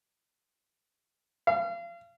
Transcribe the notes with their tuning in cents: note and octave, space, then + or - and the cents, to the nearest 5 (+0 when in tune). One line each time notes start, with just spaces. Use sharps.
F5 -35